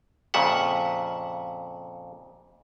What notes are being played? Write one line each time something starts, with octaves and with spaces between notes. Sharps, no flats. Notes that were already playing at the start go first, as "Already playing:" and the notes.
F2 A#2 C#3 E5 F#5